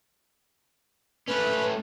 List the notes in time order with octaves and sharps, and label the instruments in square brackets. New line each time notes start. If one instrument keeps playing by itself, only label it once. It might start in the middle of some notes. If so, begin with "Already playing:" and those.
[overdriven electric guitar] A3 C#4 [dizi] B4